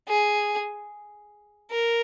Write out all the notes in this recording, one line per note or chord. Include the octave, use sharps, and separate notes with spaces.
G#4
A#4